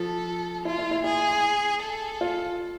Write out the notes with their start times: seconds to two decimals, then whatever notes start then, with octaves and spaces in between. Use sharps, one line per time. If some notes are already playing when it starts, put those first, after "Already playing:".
Already playing: F3 A4
0.65 E4 F4
0.78 E4
0.91 E4
1.04 E4 G#4
1.83 A4
2.21 F4